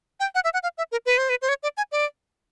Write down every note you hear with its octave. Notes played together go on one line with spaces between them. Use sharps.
G5
F#5
E5
F#5
F5
E5
A#4
B4
C5
B4
C5
C#5
D5
G#5
D5